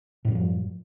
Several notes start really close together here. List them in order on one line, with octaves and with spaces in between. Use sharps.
A2 F#2 G3 F3